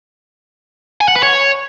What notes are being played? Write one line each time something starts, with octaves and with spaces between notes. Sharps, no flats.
G#5
F#5
B4
C#5